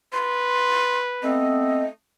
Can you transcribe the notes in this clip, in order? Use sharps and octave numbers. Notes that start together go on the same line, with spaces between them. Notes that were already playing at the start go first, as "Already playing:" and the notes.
B4 C6
A3 B3 C4 D#5